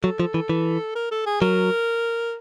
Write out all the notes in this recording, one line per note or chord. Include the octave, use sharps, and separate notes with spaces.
F#3 A4
F3
E3
E3
A#4
A4
G#4
F#3 A#4